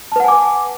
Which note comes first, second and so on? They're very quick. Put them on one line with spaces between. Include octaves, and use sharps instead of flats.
A5 B4 F#5 G#5 D6